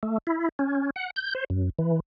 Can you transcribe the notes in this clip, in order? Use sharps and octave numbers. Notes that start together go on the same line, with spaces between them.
A3
E4
C#4
F#5
G6
C5
F#2
E3